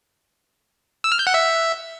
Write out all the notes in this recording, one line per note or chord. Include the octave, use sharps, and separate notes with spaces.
E6
F6
G6
F#5
E5